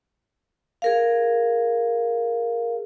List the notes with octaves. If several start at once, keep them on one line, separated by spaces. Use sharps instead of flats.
G#4 A#4 F5